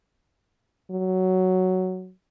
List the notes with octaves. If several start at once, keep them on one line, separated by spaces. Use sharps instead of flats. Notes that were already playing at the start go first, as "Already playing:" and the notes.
F#3